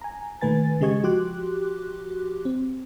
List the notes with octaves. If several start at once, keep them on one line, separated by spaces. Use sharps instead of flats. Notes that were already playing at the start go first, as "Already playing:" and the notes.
G#5 A#5
A#2 D#3 A3 B4 G#5 A6
C#3 G#3 G4 D#5 C#6 G#6
F3 F#4 G4 C6 D6 F#6
C4